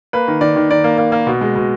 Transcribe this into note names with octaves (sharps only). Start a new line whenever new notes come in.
A#3 B4
D#3
D#3 D5
D#3
D#3 D5
A#3
A#3
A#3
B2
G#3
B2